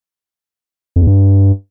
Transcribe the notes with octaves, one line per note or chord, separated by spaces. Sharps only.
F2
E2
G2